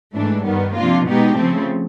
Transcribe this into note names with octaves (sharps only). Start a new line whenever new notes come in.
G#2 E3 A3 D4
G2 D#3 G3 B3
C3 F3 A#3 D4 F4
B2 G#3 B3 D#4 G4
C#3 F3 A3 C4